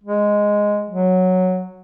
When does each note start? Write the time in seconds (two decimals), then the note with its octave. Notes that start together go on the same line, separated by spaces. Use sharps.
0.04 G#3
0.90 F#3